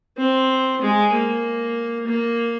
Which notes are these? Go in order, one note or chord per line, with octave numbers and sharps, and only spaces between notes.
C4
G#3
A#3
A#3